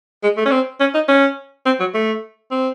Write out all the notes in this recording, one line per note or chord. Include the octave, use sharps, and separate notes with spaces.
G#3
A3
C#4
C4
C#4
D#4
C#4
C4
F#3
A3
C4